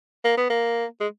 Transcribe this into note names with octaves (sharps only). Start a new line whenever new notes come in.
A#3
B3
A#3
G#3